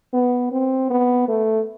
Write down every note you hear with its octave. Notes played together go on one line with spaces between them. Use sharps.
B3
C4
B3
A3